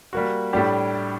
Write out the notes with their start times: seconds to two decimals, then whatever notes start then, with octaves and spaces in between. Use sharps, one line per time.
0.13 G3 A#3 F#4
0.53 A2 G3 D4 G4